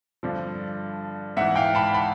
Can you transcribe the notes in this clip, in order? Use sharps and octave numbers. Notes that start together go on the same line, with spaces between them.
G2 D3 F3
G#2 E3 E5 F#5
F5 G5
A5 B5
A5 B5